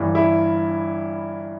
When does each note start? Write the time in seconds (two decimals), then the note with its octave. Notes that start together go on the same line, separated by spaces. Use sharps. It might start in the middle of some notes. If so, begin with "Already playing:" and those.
Already playing: G1 G2 E3
0.15 E4